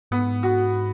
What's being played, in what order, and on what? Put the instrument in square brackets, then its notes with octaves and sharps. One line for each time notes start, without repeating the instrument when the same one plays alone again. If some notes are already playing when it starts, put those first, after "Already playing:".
[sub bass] G#2 [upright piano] B3
[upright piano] F#4